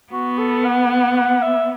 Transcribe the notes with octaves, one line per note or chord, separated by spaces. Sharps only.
B3 F#4
A4
F#5
F#5
F#5
E5